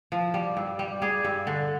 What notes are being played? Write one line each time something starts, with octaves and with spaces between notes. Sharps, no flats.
F3
G3
G2
G3
G3 G#4
G2
D3